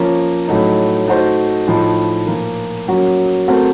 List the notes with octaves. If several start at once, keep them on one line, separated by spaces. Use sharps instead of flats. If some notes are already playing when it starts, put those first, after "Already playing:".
Already playing: F3 A#3 C#4
A2 F#3 A3 D#4
A3 D#4 F#4 C5 D#5
A2 F3 A3 D#4
A#2 F3 A#3
F#3 A#3 C#4 F#4
A3 C4 F#4 A#4